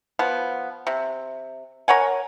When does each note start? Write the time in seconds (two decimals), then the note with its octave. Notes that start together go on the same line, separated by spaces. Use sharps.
0.19 F3 B3
0.87 C3
1.88 A#4 C#5 F#5 G#5